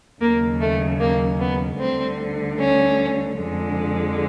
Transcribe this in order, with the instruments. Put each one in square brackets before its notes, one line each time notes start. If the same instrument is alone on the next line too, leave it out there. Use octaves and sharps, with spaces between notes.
[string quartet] D#2 C#3 F#3 A#3
A3
A#3
B3
D2 D3 G3 C4
C#4
F2 D3 F3 G#3